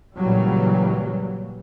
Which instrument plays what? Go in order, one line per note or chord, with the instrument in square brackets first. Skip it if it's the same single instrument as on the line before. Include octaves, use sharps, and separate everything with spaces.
[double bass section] A#2 C#3 E3 F#3 G3